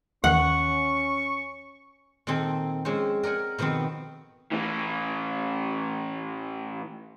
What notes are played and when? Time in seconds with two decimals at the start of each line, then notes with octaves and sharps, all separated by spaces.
0.24 D#2 D#3 E3 C#4 F#5 C#6
2.27 A#2 D#3 C4 A4
2.85 F3 G#3 C4 C#4 C5
3.23 A#4 D5 F#5 G#5
3.58 B2 D#3 F3 B3 C4
4.52 A2 E3